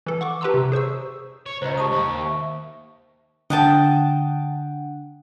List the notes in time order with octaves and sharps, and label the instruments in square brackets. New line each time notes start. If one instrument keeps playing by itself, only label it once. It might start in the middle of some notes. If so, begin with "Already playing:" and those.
[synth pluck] E3 A4
F#5 C#6 D6
G4 B4 A5 A#5 C6 E6
C3
G#4 C5 C#6 E6
[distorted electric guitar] C#5
[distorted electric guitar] C#2 [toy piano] C5 D#5 [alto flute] A#5
[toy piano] G4 A5 D#6 [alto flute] C#6
[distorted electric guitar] D#2
[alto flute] E5
[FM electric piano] D3 F#5 [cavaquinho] D#5 G5 A5